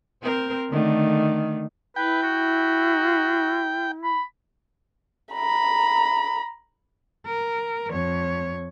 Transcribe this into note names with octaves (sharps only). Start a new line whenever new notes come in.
C4 A#4 C5
D3 D#3 A3
E4 B4 G5
F#4
B5
A#5 B5
A#4
F2 C#5